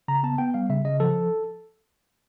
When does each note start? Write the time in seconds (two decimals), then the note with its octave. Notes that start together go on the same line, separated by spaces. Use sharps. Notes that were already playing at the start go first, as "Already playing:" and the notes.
0.08 C#3 A#5
0.23 B3 A5
0.38 B3 G5
0.54 G3 F5
0.70 C#3 E5
0.85 C#3 D#5
1.00 F3 A4